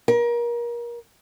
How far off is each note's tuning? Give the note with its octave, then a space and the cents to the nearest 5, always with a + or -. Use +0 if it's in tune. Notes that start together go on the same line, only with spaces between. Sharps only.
A#4 +30